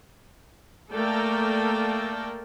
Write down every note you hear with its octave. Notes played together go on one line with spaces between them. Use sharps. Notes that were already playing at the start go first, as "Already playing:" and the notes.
A3 A#3 A4 A#4 D5 G5